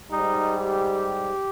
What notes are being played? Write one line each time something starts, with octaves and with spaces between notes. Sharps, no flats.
G#2 G3 D#4
G4